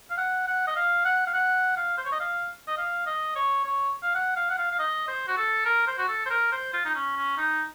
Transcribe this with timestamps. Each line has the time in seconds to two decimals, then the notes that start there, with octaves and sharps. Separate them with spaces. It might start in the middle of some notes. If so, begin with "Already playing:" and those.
0.10 F5
0.18 F#5
0.48 F#5
0.67 D#5
0.76 F5
1.05 F#5
1.27 F5
1.34 F#5
1.77 F5
1.97 C5
2.05 C#5
2.12 D#5
2.20 F5
2.68 D#5
2.78 F5
3.07 D#5
3.36 C#5
3.64 C#5
4.03 F5
4.15 F#5
4.36 F5
4.50 F#5
4.58 F5
4.72 F5
4.79 D#5
5.08 C5
5.28 F#4
5.37 A4
5.65 A#4
5.87 C5
5.98 F#4
6.09 A4
6.26 C5
6.30 A#4
6.52 C5
6.73 F4
6.85 D#4
6.95 C#4
7.17 C#4
7.38 D#4